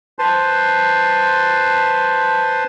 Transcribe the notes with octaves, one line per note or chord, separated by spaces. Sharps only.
B4 C5 A5 C6